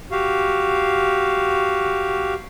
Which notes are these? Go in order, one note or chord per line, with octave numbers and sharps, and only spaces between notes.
F#4 G4 F5